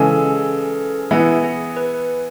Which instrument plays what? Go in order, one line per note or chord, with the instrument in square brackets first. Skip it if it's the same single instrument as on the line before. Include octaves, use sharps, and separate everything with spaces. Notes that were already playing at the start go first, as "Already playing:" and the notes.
Already playing: [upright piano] C#3 E3 G#3 [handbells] A4
[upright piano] E3 B3 E4 [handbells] G#4
[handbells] G#4
B4